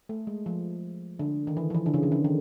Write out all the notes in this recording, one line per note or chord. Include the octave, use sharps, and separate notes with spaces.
A3
G#3
F3
D3
D#3
E3
F3
E3
D3
C#3
D#3
D3
D#3